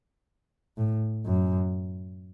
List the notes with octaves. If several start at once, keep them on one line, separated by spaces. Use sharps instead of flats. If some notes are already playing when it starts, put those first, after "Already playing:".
A2
F#2